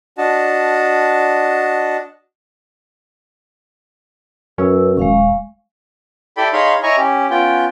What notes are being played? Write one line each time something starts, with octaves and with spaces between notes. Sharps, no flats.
D4 F#4 D#5 A5
F#2 C#4 B4 E6
D#1 G#3 F5 C#6
E4 G4 A4 D5 G5 B5
D#4 G#4 C#5 F5 B5 C6
E4 C#5 D#5 G#5 A#5 C#6
C#4 G4
B3 C#4 F4 G5